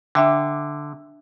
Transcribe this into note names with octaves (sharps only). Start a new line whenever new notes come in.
D3 D4 E5 G5